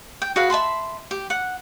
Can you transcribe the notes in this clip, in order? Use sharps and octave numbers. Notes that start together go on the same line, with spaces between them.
G5
F#4 G#4 B4 F5
E5 A5 B5 C6
G4
F#5